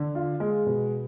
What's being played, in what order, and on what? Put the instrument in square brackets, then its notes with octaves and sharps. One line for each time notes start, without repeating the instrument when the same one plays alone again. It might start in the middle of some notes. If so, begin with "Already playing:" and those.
Already playing: [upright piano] D3
F4
G#3
B2